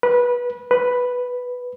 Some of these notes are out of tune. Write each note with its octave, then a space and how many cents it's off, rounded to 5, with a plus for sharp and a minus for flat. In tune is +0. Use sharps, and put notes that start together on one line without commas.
B4 -20
B4 +0